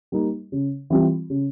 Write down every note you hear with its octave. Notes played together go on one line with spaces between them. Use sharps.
G3 A#3 D#4
C#3
E3 G3 C4 F4
C#3